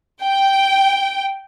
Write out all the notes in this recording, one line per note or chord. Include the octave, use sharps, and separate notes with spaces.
G5